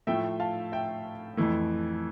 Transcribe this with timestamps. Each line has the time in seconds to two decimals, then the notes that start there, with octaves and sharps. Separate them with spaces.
0.07 A2 F3 A3 E5 G5
0.40 F5 A5
0.72 E5 G5
1.37 F2 E3 A3